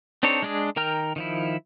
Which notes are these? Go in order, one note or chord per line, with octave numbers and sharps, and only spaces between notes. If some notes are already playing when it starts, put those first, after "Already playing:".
C4 D4 D#4 A4 C#5
G#3 D4 G#4
D#3 A#4 G5 A#5 F6
D#3 F3 E4